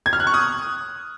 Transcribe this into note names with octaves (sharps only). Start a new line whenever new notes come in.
G#6
F6
F#6
C#6
D#6